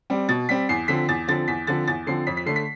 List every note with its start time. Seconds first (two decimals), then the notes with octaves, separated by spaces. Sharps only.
0.10 G3 C4
0.28 B2 A6
0.49 G3 C4 B6
0.69 E2 C7
0.88 D3 F3 C4 B6
1.08 E2 A6
1.28 D3 F3 C4 A6
1.48 E2 B6
1.67 D3 F3 C4 A6
1.87 E2 A6
2.07 D3 F3 C4 C7
2.27 F2 B6
2.37 B6
2.46 D3 A3 C7
2.56 B6